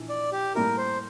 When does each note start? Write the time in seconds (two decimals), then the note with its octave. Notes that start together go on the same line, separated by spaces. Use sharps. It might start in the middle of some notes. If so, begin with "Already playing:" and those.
Already playing: A#1 E3
0.09 D5
0.32 G4
0.55 A2 G3 A#3 E4 G4 A#4
0.77 C5